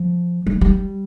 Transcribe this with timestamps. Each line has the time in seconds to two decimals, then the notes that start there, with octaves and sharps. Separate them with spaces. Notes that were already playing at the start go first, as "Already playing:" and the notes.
Already playing: F3
0.47 G3
0.61 G3